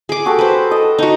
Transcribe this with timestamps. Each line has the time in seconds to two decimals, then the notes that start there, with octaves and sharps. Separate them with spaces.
0.09 G#4 D6
0.26 F#4 G4 A4
0.39 B4 C5
0.71 A4 D#5
0.99 D#4 F#4